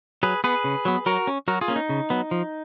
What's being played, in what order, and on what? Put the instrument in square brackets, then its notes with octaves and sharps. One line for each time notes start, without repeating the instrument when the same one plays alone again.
[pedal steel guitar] F#3 G#4 B4
B3 G#4 B4
C#3
F#3 B3
F#3 F#4 A#4
C#4
F#3 F#4 A#4
F4 G#4
A#3 C#4
D#4
C#3
F#3 B3
F3